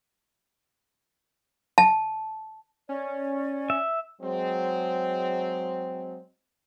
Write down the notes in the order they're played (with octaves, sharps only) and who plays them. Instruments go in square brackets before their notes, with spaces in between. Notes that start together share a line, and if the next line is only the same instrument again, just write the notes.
[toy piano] A5
[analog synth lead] C#4 [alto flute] D5
[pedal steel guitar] E5
[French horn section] F#3 G#3 C4